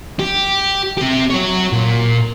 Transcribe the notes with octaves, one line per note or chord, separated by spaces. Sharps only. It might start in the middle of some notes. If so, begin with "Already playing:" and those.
G4
C4 G4
F#4 C#5
A#2